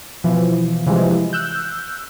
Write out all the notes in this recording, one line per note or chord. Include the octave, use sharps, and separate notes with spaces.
B2 E3 F3
C3 E3 F3 G3 G#3
E6 F#6 G6